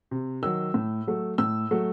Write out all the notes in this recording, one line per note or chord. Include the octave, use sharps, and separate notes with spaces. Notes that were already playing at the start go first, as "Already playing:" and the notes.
C3
D#3 F#3 E6
A2
F#3 A3
A2 E6
F#3 A3